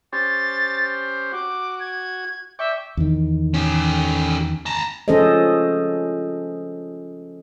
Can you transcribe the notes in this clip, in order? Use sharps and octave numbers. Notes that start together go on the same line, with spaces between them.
C#4 G4 C5 A6
F#4 D6
G#6
D5 E5 G5 C#6
E2 D#3
C#4 G4
A5 A#5
F3 C#4 G#4 A4 C5 D#5